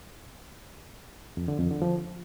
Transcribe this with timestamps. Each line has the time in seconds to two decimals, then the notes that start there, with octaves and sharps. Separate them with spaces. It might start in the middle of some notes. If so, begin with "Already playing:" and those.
1.37 F2
1.48 D3
1.59 F2
1.71 D3
1.82 F3